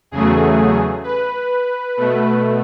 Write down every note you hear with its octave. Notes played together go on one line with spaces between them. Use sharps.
E2 C#3 F#3 A3 G#4
B4
B2 A3